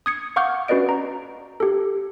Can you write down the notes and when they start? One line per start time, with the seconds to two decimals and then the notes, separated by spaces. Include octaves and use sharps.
0.06 D#6 G#6 C#7
0.36 F5 F#5 C#6 D6 F6 G6
0.68 C#4 F#4 B4 D5 D#5 D7
0.89 A#5
1.60 G4 A4